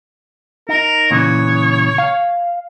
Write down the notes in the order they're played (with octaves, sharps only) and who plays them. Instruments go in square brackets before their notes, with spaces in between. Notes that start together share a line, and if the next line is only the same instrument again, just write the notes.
[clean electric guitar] D#4 [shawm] A#4
[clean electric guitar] A#2 C#3 E3 [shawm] C#5
[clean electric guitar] F5